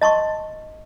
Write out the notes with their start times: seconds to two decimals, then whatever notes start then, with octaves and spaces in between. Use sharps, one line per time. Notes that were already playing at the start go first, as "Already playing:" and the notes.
0.01 D#5 A5 C6 C#6